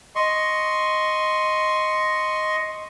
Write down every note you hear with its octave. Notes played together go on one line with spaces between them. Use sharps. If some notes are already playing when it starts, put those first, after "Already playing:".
D#5 C6 C#6